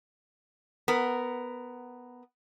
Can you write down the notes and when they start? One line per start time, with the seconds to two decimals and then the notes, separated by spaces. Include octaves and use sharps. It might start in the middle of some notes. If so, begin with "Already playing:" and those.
0.88 B3 A#4